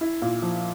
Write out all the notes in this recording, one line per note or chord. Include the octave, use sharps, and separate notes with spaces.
E4
A#2
F3